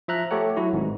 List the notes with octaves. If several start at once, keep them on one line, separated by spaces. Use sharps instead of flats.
F3 E5 A#5 F#6
A3 G4 A4 C#5 F#5
F#3 E4 F#4
G#1 G#2